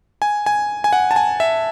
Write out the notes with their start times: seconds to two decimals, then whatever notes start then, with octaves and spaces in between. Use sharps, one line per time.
0.22 G#5
0.46 G#5
0.84 G#5
0.93 F#5
1.11 A5
1.16 G#5
1.40 E5